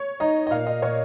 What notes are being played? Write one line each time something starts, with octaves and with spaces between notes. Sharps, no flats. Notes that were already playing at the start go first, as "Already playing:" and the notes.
Already playing: C#5
D#4 D#5
D#5
A#2 F5
D#5
A#2 C#5